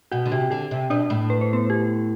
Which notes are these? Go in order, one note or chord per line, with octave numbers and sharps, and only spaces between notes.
B2 F#4 F#5
D3
C3 G4
D3 G4
C3
B2 D4 D5
A2
B4
C5
B3 B4
G4